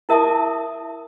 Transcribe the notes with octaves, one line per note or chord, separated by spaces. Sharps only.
E4 A#4 E5 A5 D6 D#6